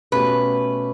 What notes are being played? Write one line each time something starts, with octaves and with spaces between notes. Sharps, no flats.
B2 A3 C#4 G4 B4